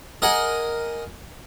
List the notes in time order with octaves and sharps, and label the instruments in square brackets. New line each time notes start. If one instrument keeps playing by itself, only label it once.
[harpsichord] G#4 A#4 D#5 F#5 G#5